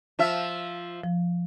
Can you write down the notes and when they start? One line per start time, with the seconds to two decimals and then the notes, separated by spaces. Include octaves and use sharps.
0.19 F3 F4 E5
1.03 F3